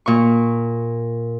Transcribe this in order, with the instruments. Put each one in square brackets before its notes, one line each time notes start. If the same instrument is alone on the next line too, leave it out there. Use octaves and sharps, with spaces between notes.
[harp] A#2 C#6